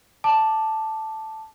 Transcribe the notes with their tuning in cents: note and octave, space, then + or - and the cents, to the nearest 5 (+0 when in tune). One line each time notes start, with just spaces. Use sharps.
A5 +0 D6 +10